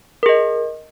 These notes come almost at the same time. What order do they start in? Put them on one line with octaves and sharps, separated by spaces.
A#4 G#4 D#5